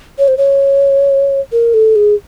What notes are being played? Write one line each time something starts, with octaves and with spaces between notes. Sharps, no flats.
C#5
C5
C#5
A#4
A4
G#4